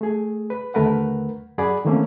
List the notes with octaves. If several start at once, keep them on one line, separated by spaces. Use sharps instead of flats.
A3 G#4
B4
D#2 D3 A3 A#4 B4 F#5
F#2 G#4 D5 F#5 B5
D#3 E3 A3 A#3 C4 C#4